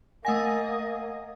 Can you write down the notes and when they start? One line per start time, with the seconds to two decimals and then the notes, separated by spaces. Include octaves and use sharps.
0.25 A3 A#3 D#5 F#5 G#5 D#6 A#6